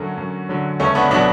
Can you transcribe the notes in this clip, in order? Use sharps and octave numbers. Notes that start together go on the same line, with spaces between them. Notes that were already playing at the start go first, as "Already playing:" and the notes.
Already playing: F#2 D3 F#3 A3 C#4
F#2
D3 F#3
C#2 A3 C#4
B3 D4
B2 F#3 B3 D4